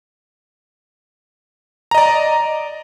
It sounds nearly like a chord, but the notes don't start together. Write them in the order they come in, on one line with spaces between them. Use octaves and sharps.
A#5 D#5 D5